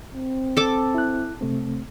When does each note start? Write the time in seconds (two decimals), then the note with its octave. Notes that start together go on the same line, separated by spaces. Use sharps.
0.14 C4
0.57 A4 D6
0.95 E4 F#6
1.41 C3 A3 C4